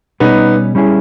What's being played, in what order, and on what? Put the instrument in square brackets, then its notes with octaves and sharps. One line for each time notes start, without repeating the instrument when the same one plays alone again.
[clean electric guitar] B2 G3 C#4 [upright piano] B3 D#4
[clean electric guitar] G3 C#4 E4 G#4